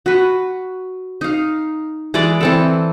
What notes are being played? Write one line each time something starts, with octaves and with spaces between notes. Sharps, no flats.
F#4 B4
D#4 F5
E3 G#3 D5
E3 C4 A4